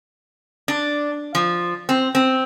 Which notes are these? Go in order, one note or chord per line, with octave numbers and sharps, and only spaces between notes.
D4
F3
C4
C4